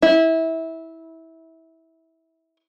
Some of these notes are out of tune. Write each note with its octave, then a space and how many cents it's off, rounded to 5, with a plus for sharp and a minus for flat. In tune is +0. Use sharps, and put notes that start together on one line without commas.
E4 -20